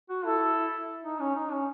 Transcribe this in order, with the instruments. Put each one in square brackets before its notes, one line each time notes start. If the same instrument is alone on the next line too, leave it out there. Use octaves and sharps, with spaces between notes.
[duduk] F#4
[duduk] E4 [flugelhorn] A4
[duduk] D#4
C#4
D#4
C#4